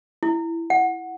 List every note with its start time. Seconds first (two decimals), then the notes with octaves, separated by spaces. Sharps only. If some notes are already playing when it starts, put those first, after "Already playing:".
0.23 E4
0.70 F#5